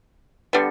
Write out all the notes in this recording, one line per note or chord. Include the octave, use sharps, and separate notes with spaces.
D3 G3 B3